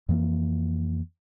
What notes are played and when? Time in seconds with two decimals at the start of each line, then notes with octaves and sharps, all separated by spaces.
0.09 F2 E3 A#3